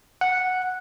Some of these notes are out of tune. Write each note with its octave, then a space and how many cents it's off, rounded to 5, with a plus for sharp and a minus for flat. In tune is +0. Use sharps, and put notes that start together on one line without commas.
F#5 -5